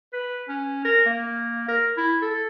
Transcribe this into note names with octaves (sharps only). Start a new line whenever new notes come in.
B4
C#4
A#4
A#3
A#4
E4
A4